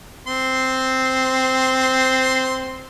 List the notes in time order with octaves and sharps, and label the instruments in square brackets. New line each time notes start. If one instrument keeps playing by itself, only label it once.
[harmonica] C4 C6